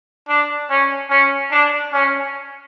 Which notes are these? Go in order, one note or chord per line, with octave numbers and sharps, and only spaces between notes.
D4
C#4
C#4
D4
C#4